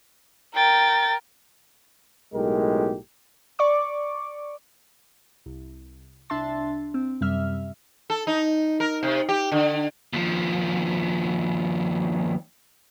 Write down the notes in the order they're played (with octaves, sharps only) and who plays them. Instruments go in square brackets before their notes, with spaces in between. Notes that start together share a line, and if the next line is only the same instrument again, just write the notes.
[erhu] A#4 [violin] G5 A6
[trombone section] B1 A2 G#3 G4 A#4
[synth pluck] D5 C#6 D6
C2
C2 D4 E5 A5 C6 A6
C4
F#2 C3 G3 E5 F6
[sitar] A4
D#4
A#4
C3
G4
D3
[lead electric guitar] D#2 F3